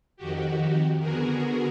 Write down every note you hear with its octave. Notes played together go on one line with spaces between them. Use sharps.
F2 D#3 F#4 G4
D3 B3 F#4 G#4 A#4